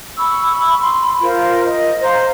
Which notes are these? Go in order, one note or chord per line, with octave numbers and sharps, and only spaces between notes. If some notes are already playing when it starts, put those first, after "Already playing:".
B5 C#6 E6
B5 C6
F4 A#4 C5
D#5
C5 F5 A#5